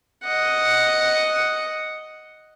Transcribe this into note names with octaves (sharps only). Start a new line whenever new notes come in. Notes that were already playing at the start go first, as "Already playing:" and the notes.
D#5 F#5